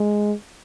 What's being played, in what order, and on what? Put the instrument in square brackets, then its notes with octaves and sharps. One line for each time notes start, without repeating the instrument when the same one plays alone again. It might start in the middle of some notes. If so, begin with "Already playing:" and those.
Already playing: [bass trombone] G#3